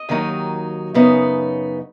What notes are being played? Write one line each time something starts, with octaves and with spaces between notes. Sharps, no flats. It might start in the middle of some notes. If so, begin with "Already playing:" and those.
Already playing: D#5
D#2 D#3 F#3 D#4
F#2 C#3 B3 D#4